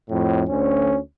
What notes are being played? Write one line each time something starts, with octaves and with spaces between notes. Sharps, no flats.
F2 A2
D2 C#4